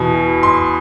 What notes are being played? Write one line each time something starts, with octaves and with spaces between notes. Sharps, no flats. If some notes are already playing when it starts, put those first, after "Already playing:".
Already playing: E2 B2
C6